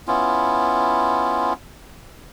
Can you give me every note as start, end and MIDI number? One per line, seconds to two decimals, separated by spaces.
0.07 1.53 59
0.07 1.53 61
0.07 1.53 64
0.07 1.53 65